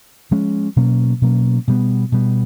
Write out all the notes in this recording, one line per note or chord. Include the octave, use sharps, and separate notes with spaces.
F3 G#3 C#4
B2 F#3 A#3 C#4
B2 F#3 A#3 C#4
B2 G3 B3
B2 G3 B3